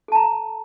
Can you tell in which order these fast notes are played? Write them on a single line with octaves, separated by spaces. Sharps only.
A4 A5 A#5